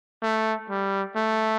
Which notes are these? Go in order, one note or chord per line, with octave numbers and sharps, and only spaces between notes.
A3
G3
A3